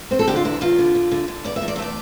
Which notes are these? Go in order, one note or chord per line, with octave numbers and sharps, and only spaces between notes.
C4 C5
A4
D3 G4
F4
E2 E4
E2 F4
D3
D3
D3
D3
B2 D5
E5
E2
D5
E5
A3 D5